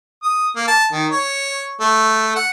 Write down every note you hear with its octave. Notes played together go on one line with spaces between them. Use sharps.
D#6
A#3
A5
D#3
C#5
A3
F#5